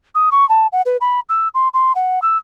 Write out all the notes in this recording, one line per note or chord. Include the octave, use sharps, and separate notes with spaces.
D#6
C#6
A5
F#5
B4
B5
E6
C6
C6
F#5
E6